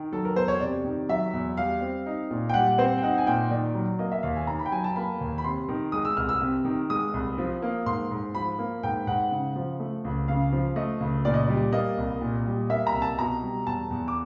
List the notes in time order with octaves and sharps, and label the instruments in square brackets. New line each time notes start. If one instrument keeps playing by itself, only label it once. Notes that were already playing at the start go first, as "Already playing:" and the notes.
Already playing: [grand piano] D#3
[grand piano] F#3 [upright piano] A4
[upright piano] A#4
[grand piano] E2 [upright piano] C5
[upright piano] C#5
[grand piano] C3 [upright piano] D5
[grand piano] D#3
[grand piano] F#3 [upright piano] E5
[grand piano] E2
[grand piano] G3 [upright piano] F5
[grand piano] C4
D#4
A#2
[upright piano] G5
[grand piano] G3 [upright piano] F#5
[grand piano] C4 [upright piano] C5
[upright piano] G5
[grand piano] D#4 [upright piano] F#5
[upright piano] G#5
[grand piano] A#2 [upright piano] G5
[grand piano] D#3 [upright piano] D5
[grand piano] F#3
[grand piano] A#3 [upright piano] D#5
[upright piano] E5
[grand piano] D#2 [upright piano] F5
[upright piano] G#5
[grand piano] D#3 [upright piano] A#5
[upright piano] B5
G5
[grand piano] F#3 [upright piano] G#5
[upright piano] A5
[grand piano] A#3 [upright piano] B5
[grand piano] D#2
[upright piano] B5
[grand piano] C3 [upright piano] C6
[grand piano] D#3
[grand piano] G#3 [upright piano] D#6
[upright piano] E6
[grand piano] C2 [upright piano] F6
[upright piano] E6
[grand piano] C3
D#3
[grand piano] G#3 [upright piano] D#6
[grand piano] C2
F3
A#3
[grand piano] G#2 [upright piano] C6
[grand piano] G#2
[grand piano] F3 [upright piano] B5
[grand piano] A#3
[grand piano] G#2 [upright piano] G5
[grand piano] G#2 [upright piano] F#5
[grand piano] C#3
F3
A3
C#2
[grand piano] C#3 [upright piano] F5
[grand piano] F3
[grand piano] A3 [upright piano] D#5
[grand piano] C#2
[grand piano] A#2 [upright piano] D5
[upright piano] D#5
[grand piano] G3 [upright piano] D5
[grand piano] A#3 [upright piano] D#5
[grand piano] C2
A#2
G3
[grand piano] A#3 [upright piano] E5
[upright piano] A#5
[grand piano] C2
[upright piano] A5
[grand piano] B2 [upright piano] A#5
[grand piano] G3
[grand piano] E2 [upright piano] A5
[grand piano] E2
[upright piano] D6